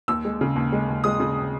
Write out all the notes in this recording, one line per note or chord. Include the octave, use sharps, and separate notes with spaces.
D#2 E6
G#3
C#3
D#2
G#3
D#2
G#3 D#6
C#3